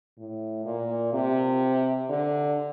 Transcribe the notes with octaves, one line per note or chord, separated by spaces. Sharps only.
A2
A#2
C3
D3